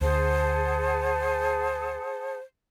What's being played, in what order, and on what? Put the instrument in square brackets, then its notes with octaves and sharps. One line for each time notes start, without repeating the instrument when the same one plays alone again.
[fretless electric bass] D2 [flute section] G#4 F#5 A5 [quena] C5